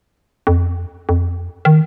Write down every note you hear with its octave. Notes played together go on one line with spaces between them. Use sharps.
F2
F2
D#3